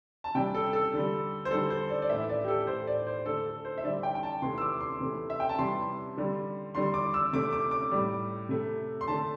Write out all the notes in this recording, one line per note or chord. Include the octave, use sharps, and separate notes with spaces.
A5
C3 G3 G5
A4
A4
D3 G3
C5
D3 G3 A4
C5
D5
D5
A2 E3 A3 E5
D5
G4
A4
A2 A3 C5
D5
C5
D3 A3 A4
A4
C5
E5
D3 G3 D5
G5
G5
A5
C3 E3 A3 C6
E6
D6
C6
C3 E3 A3
E5
G5
A5
C3 E3 G3 C6
D3 G3
D3 G3 C6
D6
E6
C3 A3 D6
D6
D6
A2 G3
C3 A3
C6
D3 A3 A5